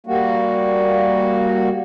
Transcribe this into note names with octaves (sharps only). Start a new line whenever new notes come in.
G3 A#3 F#4